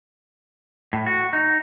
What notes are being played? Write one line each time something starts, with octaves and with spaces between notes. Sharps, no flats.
A2
F#4
D#4